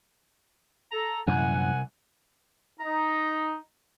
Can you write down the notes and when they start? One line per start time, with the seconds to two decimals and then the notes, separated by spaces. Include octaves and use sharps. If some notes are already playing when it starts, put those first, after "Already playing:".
0.92 A4 A#5
1.27 C2 F#2 A#2 E3 F#5 G#5
2.80 D#4 A#5